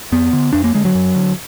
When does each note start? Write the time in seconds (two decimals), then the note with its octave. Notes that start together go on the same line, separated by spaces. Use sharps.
0.12 F2 B3
0.33 D3
0.53 F2 D4
0.64 A#3
0.74 D3 G#3
0.85 F#3
0.95 F#2
1.16 D3